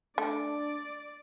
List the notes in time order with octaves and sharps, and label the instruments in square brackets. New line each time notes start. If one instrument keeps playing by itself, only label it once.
[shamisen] A3 [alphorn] D4 [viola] D5